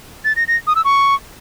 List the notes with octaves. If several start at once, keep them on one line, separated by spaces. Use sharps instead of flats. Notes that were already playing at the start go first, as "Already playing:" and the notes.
A6
A#6
A#6
D#6
E6
C#6